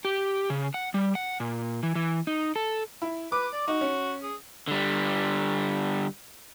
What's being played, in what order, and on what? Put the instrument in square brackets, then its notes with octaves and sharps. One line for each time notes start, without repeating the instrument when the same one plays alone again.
[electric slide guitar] G4
C#3
F#5
G3
F#5
A#2
E3
E3
D#4
A4
[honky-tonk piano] E4
[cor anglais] B4 [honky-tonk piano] D6
[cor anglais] D5
[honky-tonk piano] D#4 [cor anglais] F#4
[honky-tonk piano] C#4
[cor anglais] G#4
[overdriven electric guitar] D3 G3